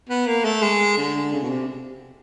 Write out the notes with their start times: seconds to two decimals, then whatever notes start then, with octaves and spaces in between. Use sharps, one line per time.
0.09 B3
0.27 A#3
0.45 A3
0.62 G#3
0.97 D3
1.33 C#3
1.43 B2
1.50 C3